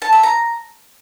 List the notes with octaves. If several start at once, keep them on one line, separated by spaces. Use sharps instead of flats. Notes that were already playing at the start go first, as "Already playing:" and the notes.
A5
E5
A#5